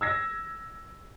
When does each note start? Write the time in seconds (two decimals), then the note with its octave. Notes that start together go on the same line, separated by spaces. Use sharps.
0.01 E6 G#6 A#6